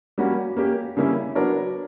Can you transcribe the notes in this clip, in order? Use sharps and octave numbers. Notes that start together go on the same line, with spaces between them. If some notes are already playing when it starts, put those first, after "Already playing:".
G3 A#3 C#4 F#4
A#3 C#4 G4
C#3 G3 A#3 C#4 E4
F#3 B3 D4 A#4 C#5